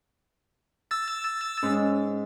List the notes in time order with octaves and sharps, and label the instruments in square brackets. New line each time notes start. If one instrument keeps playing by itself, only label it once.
[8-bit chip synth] E6 A6
[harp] G#2 [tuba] C#4